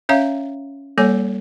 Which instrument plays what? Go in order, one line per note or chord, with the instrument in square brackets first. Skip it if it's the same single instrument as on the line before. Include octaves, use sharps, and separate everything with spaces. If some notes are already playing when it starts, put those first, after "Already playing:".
[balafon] C#4 C#5 E5 F5 A#5
G3 A#3 A4 C#5 G#5